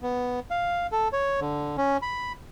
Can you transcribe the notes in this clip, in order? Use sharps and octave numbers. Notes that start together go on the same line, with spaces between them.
B3
F5
A4
C#5
D3
C#4
B5